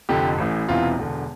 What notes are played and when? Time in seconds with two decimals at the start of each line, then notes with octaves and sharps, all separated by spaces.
0.09 F1 F2 D3 G4
0.38 A1 A2 E3
0.68 E1 E2 C3 E3 F4
0.99 E1 E2 D3